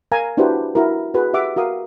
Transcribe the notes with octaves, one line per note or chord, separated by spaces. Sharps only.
A#4 F5 G#5 A#5
D4 E4 F#4 G4 B4 C5
E4 F#4 A#4
F#4 G#4 B4
G4 E5 F#5 D6
F#4 A#4 F5 D#6